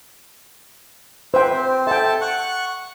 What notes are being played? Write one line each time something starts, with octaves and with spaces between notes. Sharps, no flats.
B4 C5 E5 G5
C4
A4 E5 G5 A5
F#5 C#6 F#6